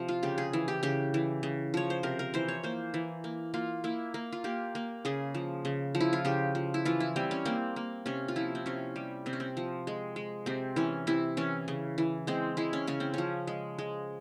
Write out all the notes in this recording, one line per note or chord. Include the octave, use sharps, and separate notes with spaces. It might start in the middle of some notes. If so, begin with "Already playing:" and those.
Already playing: C3 F3
F4
C#3 G4
G#4
E3
G4
C#3 G4
E3
C#3
F3 C#5
C5
C3 A#4
A#4
E3 C5
C#5
A#3 C5
E3
A#3
A#3 F4
A#3 E4
A#3
F4
A#3 G4
A#3
C#3 G#4
F3
C#3
F3
E4
F4
C#3 G4
F3
E4
E3 F4
E4
G3 C4
C#4
A#3 C4
A#3
C3 C#4
F4
F3 E4
C4
C3 C#4
G3
C3 C4
C#4
C4
F3
G#3
G#3
C3 C4
E3 C#4
C3 E4
E3 C#4
C#3
E3
G#3 C4
G#3 E4
C#4
C#3 C#4
C4
F3 C#4
G#3
G#3